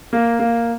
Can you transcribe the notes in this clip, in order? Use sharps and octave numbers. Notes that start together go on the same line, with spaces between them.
A#3
A#3